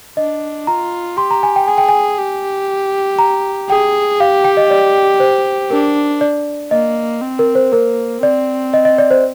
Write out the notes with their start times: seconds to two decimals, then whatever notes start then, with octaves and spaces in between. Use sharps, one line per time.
0.17 D4 D#5
0.67 F4 A#5
1.17 G4 C6
1.31 A#5
1.43 G#5
1.56 G5
1.68 G#4 G#5
1.78 G5
1.89 G#5
2.18 G4
3.19 A#5
3.69 G#4 G5
4.20 G4 F5
4.44 G5
4.57 D#5
4.70 D5
5.20 C5
5.71 D4 A#4
6.21 D5
6.71 A#3 D#5
7.22 C4
7.39 A#4
7.55 C5
7.72 A#3 A#4
8.22 C4 D5
8.74 D#5
8.85 D#5
8.98 D5
9.11 C5